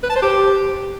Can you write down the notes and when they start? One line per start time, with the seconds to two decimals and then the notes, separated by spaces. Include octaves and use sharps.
0.03 B4
0.09 A5
0.16 C5
0.22 G4